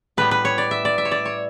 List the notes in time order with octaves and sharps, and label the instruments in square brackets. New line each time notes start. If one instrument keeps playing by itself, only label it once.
[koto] A2 G3 B3 B4
B4
C#5
D5
E5
D5
E5
C#5
D5
C#5